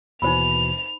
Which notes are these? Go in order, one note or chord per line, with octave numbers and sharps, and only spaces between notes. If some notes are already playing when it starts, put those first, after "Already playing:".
D#2 B2 E3 D#4 C5 B5 F7